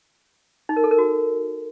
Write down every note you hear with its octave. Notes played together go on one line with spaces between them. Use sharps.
D#4
A#4
A4
A#4
F#4